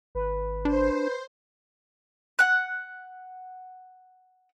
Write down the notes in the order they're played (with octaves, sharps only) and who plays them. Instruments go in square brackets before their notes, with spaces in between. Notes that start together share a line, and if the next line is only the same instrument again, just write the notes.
[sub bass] G#1 [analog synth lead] B4
[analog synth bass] D4 [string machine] C5
[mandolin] F#5 F#6